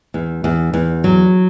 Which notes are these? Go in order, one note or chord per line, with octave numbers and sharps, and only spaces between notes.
E2
E2
E2
F#3